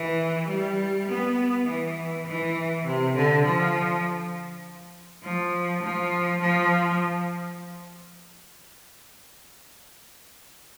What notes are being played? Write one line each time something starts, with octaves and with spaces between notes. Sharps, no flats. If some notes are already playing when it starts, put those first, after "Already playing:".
Already playing: E3
G3
B3
E3
E3
C3
D3
F3
F3
F3
F3